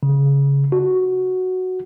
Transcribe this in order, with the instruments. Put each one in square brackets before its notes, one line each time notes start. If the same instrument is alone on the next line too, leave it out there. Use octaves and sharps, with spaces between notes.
[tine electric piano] C#3
F#4